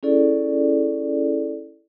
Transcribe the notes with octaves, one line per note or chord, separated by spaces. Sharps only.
C#4 E4 G#4 A4 D5